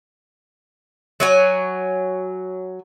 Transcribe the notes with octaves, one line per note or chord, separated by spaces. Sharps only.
F#3 C#5 G#5